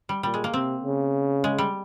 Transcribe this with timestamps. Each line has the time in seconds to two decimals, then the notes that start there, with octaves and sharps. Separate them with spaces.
0.09 G3
0.23 A#2 G3
0.34 G#3
0.44 A#3
0.54 C3 C4
0.84 C#3
1.44 G#3
1.58 G3